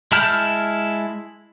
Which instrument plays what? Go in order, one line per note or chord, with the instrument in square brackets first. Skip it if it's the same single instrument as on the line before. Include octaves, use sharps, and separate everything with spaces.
[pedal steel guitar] G#3 E4 A5 F6 G6